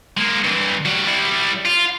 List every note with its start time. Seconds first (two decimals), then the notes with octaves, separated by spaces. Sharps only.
0.17 G#3 A#3
0.44 G2 E3
0.85 G3 F#4
1.07 G3 E4
1.65 F4